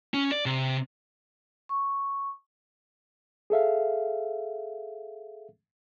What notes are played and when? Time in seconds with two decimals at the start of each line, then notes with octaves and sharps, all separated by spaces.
0.14 C#4
0.32 D5
0.46 C3
1.69 C#6
3.50 G#4 A4 E5 F5